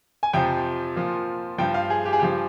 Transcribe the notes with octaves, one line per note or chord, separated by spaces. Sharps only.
G#5
F2 C3 F3 G5
A#2 F3
G2 F3 G5
F5
G#4
G4
G#4
G2 F3 G4